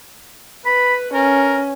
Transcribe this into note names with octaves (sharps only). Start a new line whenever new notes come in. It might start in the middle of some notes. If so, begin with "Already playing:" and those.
B4 B5
C#4 A#4